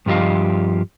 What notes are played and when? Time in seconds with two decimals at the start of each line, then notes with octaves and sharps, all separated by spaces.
0.06 G2 F3 G4 D#5 F5